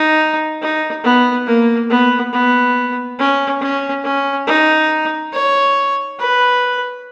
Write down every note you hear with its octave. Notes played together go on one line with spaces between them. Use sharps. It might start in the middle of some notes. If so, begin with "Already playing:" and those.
Already playing: D#4
D#4
B3
A#3
B3
B3
C#4
C#4
C#4
D#4
C#5
B4